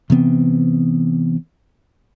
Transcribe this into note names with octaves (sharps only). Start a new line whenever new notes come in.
C3 E3 B3 C4